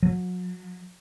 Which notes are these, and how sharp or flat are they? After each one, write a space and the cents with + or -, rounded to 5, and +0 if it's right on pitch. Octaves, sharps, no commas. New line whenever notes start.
F#3 -35